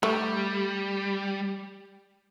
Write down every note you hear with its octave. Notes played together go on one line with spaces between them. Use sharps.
G3 A3